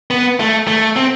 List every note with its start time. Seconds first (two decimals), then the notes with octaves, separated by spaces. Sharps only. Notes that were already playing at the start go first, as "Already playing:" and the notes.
0.11 B3
0.40 A3
0.67 A3
0.97 C4